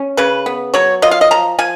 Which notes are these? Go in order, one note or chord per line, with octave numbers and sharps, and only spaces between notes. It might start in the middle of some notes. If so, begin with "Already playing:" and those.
Already playing: C#4
C#3 B4
B3
F#3 C#5
F4 D#5
F5
D#5
F3 A#5
F3 G#5